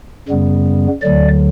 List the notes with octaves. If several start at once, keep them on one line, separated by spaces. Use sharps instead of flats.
F#2 C#3 G3 B3
D2 D3 F#3 D5